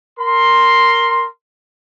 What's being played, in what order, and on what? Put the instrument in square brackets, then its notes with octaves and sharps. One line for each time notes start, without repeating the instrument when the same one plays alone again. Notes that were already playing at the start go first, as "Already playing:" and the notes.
[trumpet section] A#4 C6